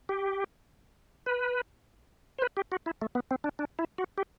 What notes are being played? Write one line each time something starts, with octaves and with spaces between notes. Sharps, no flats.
G4
B4
C5
B4
G4
F#4
E4
A3
B3
C4
D4
D4
E4
F#4
G4